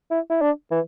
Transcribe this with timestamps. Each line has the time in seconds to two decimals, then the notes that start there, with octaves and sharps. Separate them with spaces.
0.11 E4
0.30 E4
0.41 D4
0.71 E3